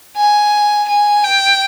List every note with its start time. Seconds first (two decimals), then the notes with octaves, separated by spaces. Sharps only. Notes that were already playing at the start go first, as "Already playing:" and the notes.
0.16 G#5
0.88 G#5
1.24 G5